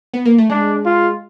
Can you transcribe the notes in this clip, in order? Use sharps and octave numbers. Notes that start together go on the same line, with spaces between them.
B3
A#3
A3
G#3 D4
F4